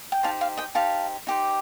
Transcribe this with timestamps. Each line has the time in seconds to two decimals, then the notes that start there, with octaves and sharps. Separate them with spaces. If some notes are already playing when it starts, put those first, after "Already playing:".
0.12 G5
0.23 D#4 G4 C5 F5 A5
0.41 F5
0.57 D#5 G5
0.75 D#4 G4 C5 F5 A5
1.27 D#4 G4 C5